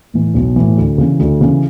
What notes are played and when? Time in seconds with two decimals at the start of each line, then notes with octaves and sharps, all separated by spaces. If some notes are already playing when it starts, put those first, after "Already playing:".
0.14 A2 E3
0.34 B1
0.56 A2 E3
0.77 D2
0.98 C#3 E3
1.19 D2
1.41 C#3 E3